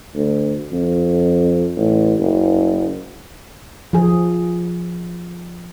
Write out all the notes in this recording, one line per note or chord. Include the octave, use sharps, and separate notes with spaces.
D2
F2
A1
F#1
F3 G#4